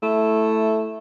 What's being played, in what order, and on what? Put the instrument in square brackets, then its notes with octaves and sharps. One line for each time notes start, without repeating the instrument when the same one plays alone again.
[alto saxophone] A3 [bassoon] E4